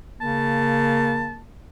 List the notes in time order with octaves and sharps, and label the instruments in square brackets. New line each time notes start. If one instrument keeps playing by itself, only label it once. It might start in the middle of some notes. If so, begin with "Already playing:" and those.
[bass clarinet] C#3 [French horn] A#3 [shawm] A5